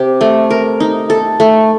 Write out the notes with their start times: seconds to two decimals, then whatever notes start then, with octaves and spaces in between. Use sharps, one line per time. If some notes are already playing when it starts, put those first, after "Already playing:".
Already playing: C3 G4
0.21 A3
0.50 A#4
0.80 D#4
1.10 A4
1.40 A3